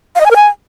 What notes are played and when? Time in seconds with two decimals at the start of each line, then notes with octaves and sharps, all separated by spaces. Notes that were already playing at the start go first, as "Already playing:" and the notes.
0.15 F5
0.21 D#5
0.26 G#5
0.31 A#4
0.36 G#5